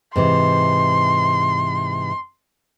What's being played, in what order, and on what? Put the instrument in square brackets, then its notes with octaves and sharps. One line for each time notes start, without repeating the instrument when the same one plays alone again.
[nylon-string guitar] G#2 C3 E3 [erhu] C6